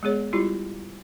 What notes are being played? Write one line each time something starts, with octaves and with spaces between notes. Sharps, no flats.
G#3 B3 G#4 C#5
G3 E4 F4 G4